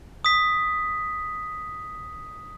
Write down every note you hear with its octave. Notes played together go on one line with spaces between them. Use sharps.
D#6 B6